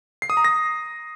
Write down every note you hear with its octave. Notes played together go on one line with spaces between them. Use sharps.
C7
D#6
A#5
A#6